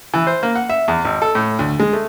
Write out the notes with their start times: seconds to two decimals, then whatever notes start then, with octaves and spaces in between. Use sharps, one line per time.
0.14 E3
0.27 C5
0.43 A#3
0.55 F#5
0.70 E5
0.88 E2
1.05 G#1
1.22 A4
1.35 A2
1.59 D2
1.80 G#3
1.93 A3